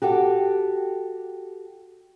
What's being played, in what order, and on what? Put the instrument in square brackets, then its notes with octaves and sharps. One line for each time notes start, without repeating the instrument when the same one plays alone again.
[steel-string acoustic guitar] F#4 G4 A4